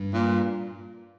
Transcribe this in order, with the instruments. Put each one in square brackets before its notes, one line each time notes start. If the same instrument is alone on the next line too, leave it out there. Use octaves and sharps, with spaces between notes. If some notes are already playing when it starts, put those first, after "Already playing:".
Already playing: [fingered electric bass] G2
[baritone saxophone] A#2